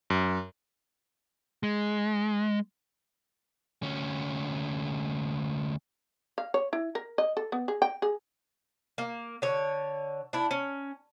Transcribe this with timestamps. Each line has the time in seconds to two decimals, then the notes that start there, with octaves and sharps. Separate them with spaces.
0.10 F#2
1.63 G#3
3.83 D2 C#4
6.38 F5
6.54 C#5
6.73 E4
6.95 A#4
7.18 D#5
7.37 A4
7.52 B3
7.68 G#4
7.82 G5
8.02 G#4
8.98 A#3
9.42 D3 C#5
10.33 D4 E4
10.51 C#4